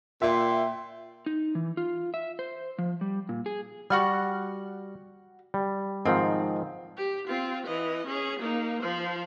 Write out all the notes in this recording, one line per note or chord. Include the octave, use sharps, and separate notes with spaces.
A#2 E5 G5 C6
D#4
E3
F4
E5
C5
F3
G3
A#2
G#4
G3 F#4 F#5 F6
G3
G#2 D#3 F3 C4
G4
C4 F4
E3 D#5
C#4 G#4
A#3 D#4
F3 C5